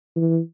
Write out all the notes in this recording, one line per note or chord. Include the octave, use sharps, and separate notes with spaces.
E3